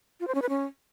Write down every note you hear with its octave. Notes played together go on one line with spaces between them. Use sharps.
F4
C5
C#4
B4
C#4